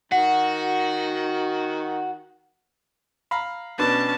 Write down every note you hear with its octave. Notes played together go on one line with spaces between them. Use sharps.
D#3 F#4 F#5
F5 A#5 B5
B2 B3 C#4 D4 A5